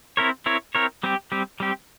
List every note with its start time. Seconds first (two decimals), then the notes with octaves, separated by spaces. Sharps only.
0.17 C4 E4 A#4 C#5
0.46 C4 E4 A#4 C#5
0.75 C4 E4 A#4 C#5
1.03 G3 C4 G4
1.32 G3 C4 G4
1.60 G3 C4 G4